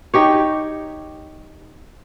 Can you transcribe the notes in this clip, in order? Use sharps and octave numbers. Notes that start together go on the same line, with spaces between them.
D#4 G4 C#5